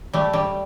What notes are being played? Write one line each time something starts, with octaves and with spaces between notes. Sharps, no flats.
G3 A3
G3